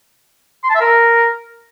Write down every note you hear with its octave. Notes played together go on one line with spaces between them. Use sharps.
C6
A5
E5
A#4